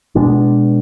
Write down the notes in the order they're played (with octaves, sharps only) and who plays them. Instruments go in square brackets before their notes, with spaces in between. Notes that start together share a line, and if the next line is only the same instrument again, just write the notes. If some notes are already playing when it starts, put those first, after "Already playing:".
[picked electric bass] B2 G#3 B3 D4